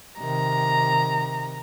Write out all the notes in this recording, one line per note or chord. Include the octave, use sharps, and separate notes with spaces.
C3 D#3 A#5